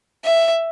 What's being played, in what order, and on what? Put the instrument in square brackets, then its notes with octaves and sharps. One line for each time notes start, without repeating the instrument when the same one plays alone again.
[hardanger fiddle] E5